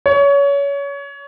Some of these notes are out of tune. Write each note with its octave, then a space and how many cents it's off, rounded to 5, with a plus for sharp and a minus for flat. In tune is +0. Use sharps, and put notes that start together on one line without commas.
C#5 +25